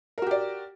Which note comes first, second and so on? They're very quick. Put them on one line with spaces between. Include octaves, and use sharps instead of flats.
A#4 F#4 G4 D5